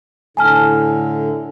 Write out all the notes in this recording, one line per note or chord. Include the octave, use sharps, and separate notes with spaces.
A2 D3 G#5 A5 F6